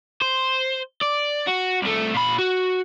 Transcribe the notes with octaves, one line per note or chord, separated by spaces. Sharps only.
C5
D5
F#4
C2 A3
A#2 B5
F#4